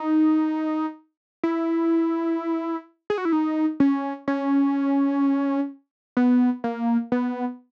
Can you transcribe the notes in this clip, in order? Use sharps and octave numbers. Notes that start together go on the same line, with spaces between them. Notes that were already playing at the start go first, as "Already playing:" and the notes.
Already playing: D#4
E4
G#4
F#4
E4
D#4
C#4
C#4
B3
A#3
B3